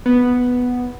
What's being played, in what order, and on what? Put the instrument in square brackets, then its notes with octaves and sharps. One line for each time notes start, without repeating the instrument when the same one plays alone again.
[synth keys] B3